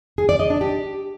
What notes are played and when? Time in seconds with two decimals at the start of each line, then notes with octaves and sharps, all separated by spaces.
0.18 G#4
0.29 D5
0.40 D#5
0.50 D4
0.61 G4